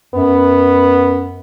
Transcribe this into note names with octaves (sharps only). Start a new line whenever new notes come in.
F#2 B3